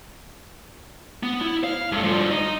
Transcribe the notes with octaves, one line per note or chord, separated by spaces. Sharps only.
B3
E4
F5
G2 A3
G2 F3
D#4